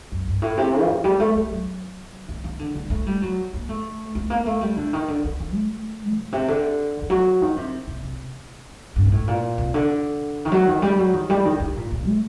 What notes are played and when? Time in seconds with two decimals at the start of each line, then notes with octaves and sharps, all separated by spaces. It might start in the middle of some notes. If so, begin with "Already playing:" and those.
0.12 F#2
0.27 G2
0.42 A2
0.58 C3
0.83 F#3
0.89 D#3
1.04 G3
1.20 A3
1.35 G3
1.51 F#3
2.28 D#3
2.44 D#3
2.59 D3
2.75 D3
2.90 A3
3.07 G3
3.22 F#3
3.53 A#3
3.69 A3
4.15 A3
4.30 A#3
4.46 A3
4.61 G3
4.76 D3
4.93 D#3
5.08 D3
5.24 D#3
5.39 D#3
5.54 A3
6.17 A#2
6.32 C3
6.48 D3
7.02 D#3
7.10 F#3
7.41 D#3
7.57 C3
7.87 C3
8.03 C3
8.96 G2
9.05 A#2
9.12 A2
9.28 A#2
9.58 C3
9.74 D3
10.45 D#3
10.52 F#3
10.68 D#3
10.82 G3
10.98 F#3
11.13 D#3
11.30 G3
11.45 D#3
11.60 D3
11.76 A#2
11.92 A#2
12.07 A3